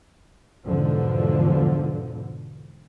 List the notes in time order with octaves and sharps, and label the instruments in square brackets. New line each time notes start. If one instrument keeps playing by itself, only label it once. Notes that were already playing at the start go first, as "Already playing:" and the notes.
[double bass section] E2 G#2 B2 D3 F3